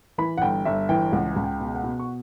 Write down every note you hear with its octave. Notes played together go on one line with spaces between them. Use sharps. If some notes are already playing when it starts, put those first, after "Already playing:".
E3 B5
F#5
G1 G5
G1 E5
E3 G5
C#2 F#5
C#2
G5
B2
F#5
B2
C#6